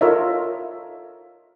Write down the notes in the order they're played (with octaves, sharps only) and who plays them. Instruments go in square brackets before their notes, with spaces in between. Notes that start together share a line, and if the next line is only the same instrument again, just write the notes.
[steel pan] F4 A4 A#4 C#5 D#5 E5